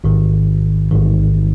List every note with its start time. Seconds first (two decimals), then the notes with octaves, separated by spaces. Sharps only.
0.04 A1 G#2 D#3
0.92 A1 G#2 D#3